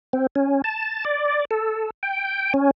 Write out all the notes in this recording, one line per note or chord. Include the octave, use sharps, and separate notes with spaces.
C4
C#4
A5
D5
A4
G5
C#4